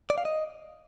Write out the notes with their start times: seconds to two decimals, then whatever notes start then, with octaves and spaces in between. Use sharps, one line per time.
0.10 D5
0.18 F5
0.25 D#5